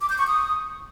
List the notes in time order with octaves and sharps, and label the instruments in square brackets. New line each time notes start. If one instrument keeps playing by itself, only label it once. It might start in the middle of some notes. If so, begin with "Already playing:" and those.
[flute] D6
G6
C#6
D#6